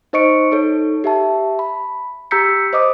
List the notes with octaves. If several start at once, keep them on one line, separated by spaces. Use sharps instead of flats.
D#4 C5 D#5 C#6 C#7 D7
D#4 A4 C#5
G4 E5 A5
B5
G4 A#5 E6 G6 B6 C#7
C5 D#5 D6 D#6